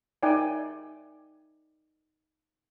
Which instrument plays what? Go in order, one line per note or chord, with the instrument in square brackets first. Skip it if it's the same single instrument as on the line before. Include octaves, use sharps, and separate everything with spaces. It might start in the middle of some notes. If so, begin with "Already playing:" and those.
[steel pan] D#4 D5 E5 G5 G#5